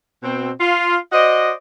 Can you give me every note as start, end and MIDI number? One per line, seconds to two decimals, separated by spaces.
0.23 0.51 47
0.23 0.51 60
0.60 0.96 65
1.12 1.52 66
1.12 1.52 72
1.12 1.52 74
1.12 1.52 75